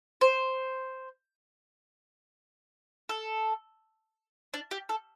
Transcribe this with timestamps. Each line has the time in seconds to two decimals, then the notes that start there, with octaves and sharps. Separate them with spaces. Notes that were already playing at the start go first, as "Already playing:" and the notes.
0.21 C5
3.09 A4
4.54 D4
4.71 G4
4.89 A4